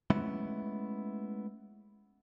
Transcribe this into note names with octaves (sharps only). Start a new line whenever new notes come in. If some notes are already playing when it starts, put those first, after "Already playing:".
G#3 A3 B3 C#4 E4